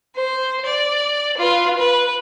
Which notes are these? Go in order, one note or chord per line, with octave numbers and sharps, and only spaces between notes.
C5
D5
F4 B4
B4